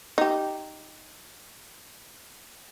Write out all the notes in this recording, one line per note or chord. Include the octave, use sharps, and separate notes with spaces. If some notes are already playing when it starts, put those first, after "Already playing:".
D#4 G4